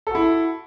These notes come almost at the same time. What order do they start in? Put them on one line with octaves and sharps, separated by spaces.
A4 F#4 E4